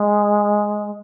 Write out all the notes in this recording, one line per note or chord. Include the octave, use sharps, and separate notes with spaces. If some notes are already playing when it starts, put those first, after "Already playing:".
Already playing: G#3